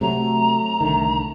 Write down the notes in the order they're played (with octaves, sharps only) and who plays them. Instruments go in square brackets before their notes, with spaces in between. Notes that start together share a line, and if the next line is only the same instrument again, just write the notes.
[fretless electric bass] C3 F#3 [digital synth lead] A3 [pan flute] A#5
[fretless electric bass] C2 D3 D#3